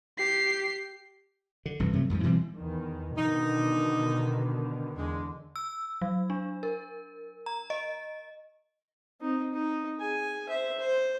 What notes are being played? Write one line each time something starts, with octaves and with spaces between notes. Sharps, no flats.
G4 C7
D3
F1 G2 C3 E3
C3 F#3 A3
F2 G#2 D#3 F3
B2 E3 G3 C4
E2 D#3
B2 D3 D#3 D#4
E2 D3 G#3
E6
F#3
D4
A#4
A#5
D#5
C4 D#4
D#4
G#4 G#5
C5 E5
C5